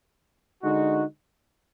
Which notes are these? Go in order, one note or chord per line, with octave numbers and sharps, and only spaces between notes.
D3 G#3 D#4 F#4